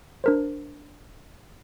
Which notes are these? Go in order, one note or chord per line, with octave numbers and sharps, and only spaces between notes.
D4 A#4 C5